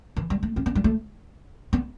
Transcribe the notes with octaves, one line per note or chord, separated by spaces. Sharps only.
E3
G3
A3
C4
B3
G3
A3
B3